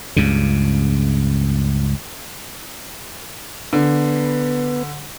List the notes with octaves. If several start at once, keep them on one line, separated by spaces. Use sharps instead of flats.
C#2 G2 C#3
D3 B3 B4